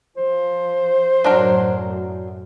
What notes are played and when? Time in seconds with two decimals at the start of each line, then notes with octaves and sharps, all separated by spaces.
0.17 F3 C5
1.24 F#2 A2 F#3 D4 A#4